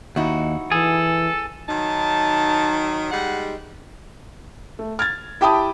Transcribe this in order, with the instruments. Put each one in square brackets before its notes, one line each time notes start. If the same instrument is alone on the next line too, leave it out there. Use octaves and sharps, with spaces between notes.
[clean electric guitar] D#2 [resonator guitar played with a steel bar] D#4 E4 F#4
[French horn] E3 [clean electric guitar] G#4 [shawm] A4
[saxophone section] D#3 F#3 D#4 [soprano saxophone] A5
[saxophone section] G3 G#3 D#4 [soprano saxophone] F#5
[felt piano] A3
F6 G#6 A6
E4 G4 G5 A5 B5 D#6